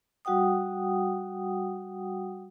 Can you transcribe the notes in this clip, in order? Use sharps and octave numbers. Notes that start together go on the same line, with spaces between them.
G3 F#4 F#5 G5 D#6